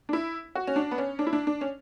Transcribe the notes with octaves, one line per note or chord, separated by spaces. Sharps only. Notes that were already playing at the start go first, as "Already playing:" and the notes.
D4
E4
F#4
C#4
D4
B3
C#4
D4
E4
D4
D4
C#4